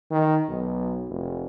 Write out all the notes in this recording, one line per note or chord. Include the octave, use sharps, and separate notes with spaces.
D#3
B1
F1